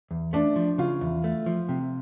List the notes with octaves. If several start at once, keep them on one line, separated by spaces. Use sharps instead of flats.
E2
A3 D4
F3
C#3 F4
E2
A3
F3
C3